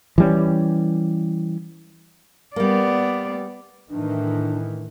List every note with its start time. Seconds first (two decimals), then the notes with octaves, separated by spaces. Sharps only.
0.18 E3 G3 C#4
2.56 G3 A#3 B3 D5
3.90 A2 D#3 E3 D4